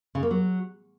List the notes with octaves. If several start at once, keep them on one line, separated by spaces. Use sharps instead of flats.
C#3
A#3
F#3